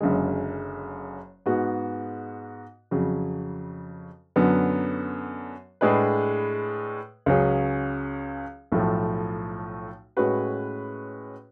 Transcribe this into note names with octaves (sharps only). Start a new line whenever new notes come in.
F#1 F#2 D3 G#3
G#2 G#3 B3 F#4
F2 C#3 F#3
F#2 D3 F#3 B3
A2 G#3 D4 G#4 B4
C#2 C#3 F#3 C#4 G#4
B1 A2 F3 A3
A2 G#3 C#4 F#4 B4